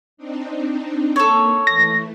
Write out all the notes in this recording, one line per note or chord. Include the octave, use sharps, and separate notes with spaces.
C4 D4 D#4
A#3 A4 C#5
E3 A3 A#6